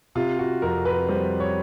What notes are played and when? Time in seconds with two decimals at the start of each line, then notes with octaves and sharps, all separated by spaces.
0.15 C3 F4
0.39 F#4
0.62 F2 A#4
0.85 B4
1.09 G3 C5
1.40 C#5